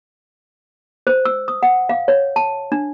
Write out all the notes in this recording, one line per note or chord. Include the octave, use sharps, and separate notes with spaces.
C5
E6
D#6
F#5
F5
C#5
A5
D4